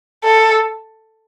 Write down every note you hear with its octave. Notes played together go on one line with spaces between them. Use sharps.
A4